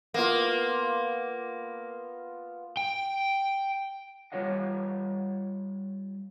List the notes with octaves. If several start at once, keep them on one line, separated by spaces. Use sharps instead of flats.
A#3 B3 F4
G5
G3 A3 F4 C#5 D#5 F#5